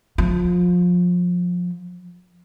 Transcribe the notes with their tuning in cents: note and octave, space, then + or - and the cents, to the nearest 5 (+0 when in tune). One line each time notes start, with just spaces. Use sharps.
F3 +25